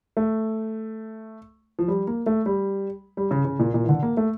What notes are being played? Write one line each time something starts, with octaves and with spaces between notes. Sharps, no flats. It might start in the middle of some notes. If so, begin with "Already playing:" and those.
A3
F3
G3
A#3
A3
G3
G3
C#3
C#3
A#2
A#2
E3
D3
A#3
A3